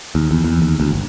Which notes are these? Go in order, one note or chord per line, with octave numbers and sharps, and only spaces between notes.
D#2
E2
E2
D#2
D2
G1